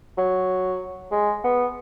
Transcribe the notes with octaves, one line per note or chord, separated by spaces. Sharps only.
F#3
G#3
B3